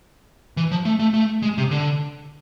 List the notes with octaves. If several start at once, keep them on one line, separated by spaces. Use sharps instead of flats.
E3
F3
A3
A3
A3
G#3
C3
D3